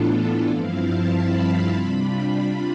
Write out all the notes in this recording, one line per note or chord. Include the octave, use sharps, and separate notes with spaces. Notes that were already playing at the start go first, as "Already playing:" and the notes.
Already playing: A2 E3 B3 D4 F4 A4
G2 F3 C4 E4 F5
A5
B5
C3 G3 D4 F4
B5